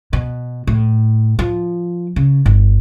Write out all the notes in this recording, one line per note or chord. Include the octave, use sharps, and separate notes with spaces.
B2
A2
F3
C#3
G1